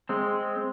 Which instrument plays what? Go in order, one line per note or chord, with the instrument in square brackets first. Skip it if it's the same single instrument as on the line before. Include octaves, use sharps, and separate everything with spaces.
[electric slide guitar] G#3 C4